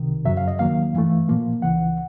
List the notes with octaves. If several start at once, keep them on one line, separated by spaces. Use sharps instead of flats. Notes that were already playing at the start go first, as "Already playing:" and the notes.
Already playing: C2 C3 D#3
F#2 C#3 F#3 E5
F5
D#5
D#2 D#3 F#3 A#3 F5
G2 E3 A3
A#2 F3 A#3
C#2 C#3 E3 F#5